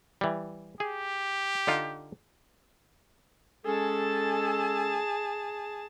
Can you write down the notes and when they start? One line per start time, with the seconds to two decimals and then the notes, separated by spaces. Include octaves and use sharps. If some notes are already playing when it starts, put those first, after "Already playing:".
0.21 E3 G3
0.80 G4 G#4
1.67 D3 D#4 F4
3.65 G#3 C#4 G#4 A4 A5